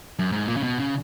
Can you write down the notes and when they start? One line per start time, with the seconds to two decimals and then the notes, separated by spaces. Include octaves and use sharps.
0.19 F#2
0.32 G#2
0.48 A#2
0.57 C#3
0.63 B2
0.79 C#3